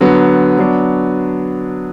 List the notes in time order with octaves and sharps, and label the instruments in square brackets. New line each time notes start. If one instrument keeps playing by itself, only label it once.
[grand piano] D3 F#3 B3
F#3 B3 D4